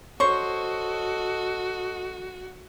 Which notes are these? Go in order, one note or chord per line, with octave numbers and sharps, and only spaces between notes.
F#4 A4 C5 C#5 D#5 C#6